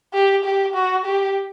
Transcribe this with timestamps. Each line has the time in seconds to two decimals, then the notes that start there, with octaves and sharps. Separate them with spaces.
0.14 G4
0.44 G4
0.75 F#4
1.05 G4